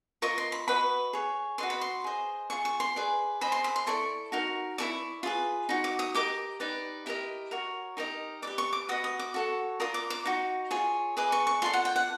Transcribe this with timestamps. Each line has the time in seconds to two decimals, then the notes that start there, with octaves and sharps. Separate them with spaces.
0.22 F4 A#4 D#5 C#6
0.38 C6
0.52 B5
0.68 F#4 B4 D#5 B5
1.13 G#4 C#5
1.58 F#4 B4 D#5 C6
1.70 B5
1.81 C6
2.04 G#4 C5 D#5
2.50 F4 G#4 C#6
2.65 C#6
2.80 C6
2.96 G#4 B4 D5
3.41 G#4 C5 D#5 B5
3.52 C6
3.64 B5
3.76 C6
3.87 E4 A4 D5 C#6
4.32 D#4 F#4 A#4
4.78 E4 A4 D5 C#6
5.23 F4 G#4 B4
5.69 D#4 F#4
5.84 D6
5.99 D#6
6.15 G4 A#4 D#5 D6
6.60 D#4 G4 B4 D5
7.06 E4 G4 A#4 D#5
7.51 F#4 A#4 C#5
7.97 D#4 G4 A#4 D#5
8.42 G4 B4 D5 D6
8.58 C#6
8.73 D6
8.89 F#4 B4 D#5 D#6
9.04 D#6
9.19 D6
9.34 F#4 A4 C#5
9.80 F4 A#4 D5 D#6
9.94 D6
10.10 D6
10.25 D#4 F#4
10.71 F4 G#4 C#5
11.17 G#4 B4 D#5 D6
11.32 C#6
11.47 C#6
11.62 F4 A4 D5 C6
11.73 F#5
11.85 G5
11.96 F#5